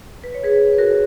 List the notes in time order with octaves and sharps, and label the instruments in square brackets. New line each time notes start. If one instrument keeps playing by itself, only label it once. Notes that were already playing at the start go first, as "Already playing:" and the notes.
[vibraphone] B4
C#5
G#4 B4
B4
F#4 A#4